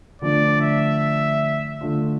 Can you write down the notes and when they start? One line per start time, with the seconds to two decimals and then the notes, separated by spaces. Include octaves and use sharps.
0.22 D3 F3 A3 D4 D5
0.61 E5
1.81 D3 A3 D4 F4